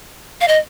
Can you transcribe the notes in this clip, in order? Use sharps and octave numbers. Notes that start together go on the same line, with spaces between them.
F5
D#5